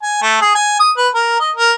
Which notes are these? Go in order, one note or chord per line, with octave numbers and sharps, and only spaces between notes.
G#5
A3
G#4
G#5
D#6
B4
A#4
D#5
A#4